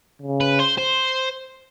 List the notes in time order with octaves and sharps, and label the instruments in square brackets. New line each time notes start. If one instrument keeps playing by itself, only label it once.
[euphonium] C#3
[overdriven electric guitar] B4
C5
C5